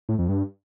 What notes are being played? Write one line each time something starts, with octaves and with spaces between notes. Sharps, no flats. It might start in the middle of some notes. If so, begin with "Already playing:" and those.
A2
F2
G2